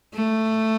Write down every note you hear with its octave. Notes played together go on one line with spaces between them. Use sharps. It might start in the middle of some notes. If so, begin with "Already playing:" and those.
A3